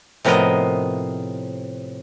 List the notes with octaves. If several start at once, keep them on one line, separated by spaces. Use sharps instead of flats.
A2 C3 F3 B3 A#4 D#5